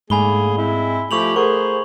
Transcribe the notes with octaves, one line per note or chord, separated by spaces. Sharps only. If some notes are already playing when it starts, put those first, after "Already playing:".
G#2 D3 A3 A#3 G#4 G#5 B5 G7
G#3 C4 E4
F3 A3 E4 G4 C#6 F7 F#7
A3 G#4 A#4 C5 F#5 C#6